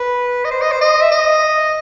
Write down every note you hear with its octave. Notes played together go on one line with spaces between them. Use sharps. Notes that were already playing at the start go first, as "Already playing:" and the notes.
Already playing: B4
D#5
C5
D#5
C5
D#5
E5
D#5